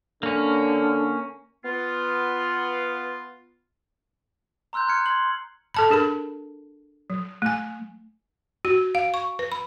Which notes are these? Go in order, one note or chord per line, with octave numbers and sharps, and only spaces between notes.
D3 A#3 C#4
B3 F4
A#5 C6 E6 F#6 G6
A#5 F6 F#6 G#6 C#7
C6 G#6 C7 F#7
A4 A5 B5
D4 G#4 A#4 B5
F#3
A3 G#5
F#4
F5
C#6
B4
B5